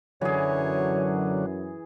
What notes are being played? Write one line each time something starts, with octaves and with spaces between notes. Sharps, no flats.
F#2 D3 E3 F#3 G#4 C#5